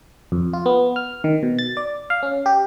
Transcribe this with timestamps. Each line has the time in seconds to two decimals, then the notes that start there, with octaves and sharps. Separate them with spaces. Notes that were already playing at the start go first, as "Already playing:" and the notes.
0.32 F2
0.53 F4
0.66 B3
0.96 F6
1.24 D#3
1.43 B2
1.59 A6
1.77 D5
2.10 F5
2.23 C#4
2.46 G4